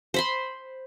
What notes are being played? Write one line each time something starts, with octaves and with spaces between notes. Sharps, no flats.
C5 B5 C6